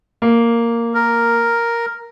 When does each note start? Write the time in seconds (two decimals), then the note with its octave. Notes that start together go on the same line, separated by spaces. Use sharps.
0.22 A#3
0.94 A#4